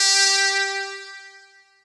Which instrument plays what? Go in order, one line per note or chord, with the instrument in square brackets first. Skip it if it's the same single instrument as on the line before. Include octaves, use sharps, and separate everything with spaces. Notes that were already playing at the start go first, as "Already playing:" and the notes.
Already playing: [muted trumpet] G4